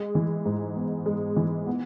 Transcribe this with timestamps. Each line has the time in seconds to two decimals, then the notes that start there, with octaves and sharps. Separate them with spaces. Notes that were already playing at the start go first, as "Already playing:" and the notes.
Already playing: G#3
0.15 E3
0.46 G#2
0.76 B3
1.06 G#3
1.36 E3
1.67 B3